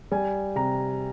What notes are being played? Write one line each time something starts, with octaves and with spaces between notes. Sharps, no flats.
G3 G#5
C3 A#5